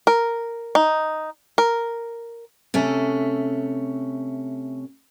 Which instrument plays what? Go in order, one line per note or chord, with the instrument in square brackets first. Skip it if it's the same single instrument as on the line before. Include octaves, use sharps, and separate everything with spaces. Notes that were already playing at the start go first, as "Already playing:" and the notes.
[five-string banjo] A#4
D#4
A#4
[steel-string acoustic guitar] C3 A3 C#4